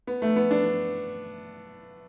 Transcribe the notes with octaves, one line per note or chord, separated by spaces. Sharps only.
B3
A3
B3
D4